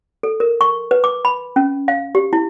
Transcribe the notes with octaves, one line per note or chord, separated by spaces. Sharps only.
A4
A#4
C#6
B4
D6
B5
C#4
F5
G4
E4